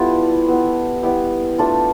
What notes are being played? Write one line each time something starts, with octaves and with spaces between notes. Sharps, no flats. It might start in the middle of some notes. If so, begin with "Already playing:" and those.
Already playing: G3 B3 E4 F4 G4 A4
G3 B3 E4
G3 B3 E4 G4
A3 D4 F4